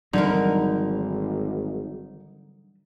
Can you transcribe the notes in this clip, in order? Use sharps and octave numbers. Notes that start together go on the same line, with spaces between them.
G#1 D3 E3 F#3 G3 D#4 E4 A#4